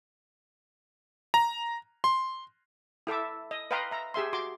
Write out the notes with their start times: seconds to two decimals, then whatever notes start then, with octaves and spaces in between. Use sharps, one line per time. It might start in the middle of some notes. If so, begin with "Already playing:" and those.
1.34 A#5
2.04 C6
3.07 E4 A4 E5 D6
3.51 D#5
3.71 B4 D#5 F5 G5 A#5 C6
3.91 E5 A#5
4.14 G4 G#4 E5 C6
4.33 F#4 C6 D6